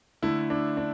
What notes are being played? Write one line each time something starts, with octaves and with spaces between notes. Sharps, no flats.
D3 A3 E4
D4
D4